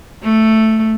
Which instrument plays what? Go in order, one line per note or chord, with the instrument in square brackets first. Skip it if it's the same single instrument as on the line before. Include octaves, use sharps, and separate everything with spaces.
[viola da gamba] A3